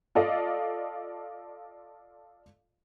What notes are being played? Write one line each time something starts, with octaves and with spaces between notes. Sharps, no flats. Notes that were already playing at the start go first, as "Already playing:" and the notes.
F4 A4 D5 D#5 F5